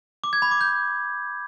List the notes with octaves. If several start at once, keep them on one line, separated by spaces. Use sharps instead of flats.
D6
G#6
B5
D6
G6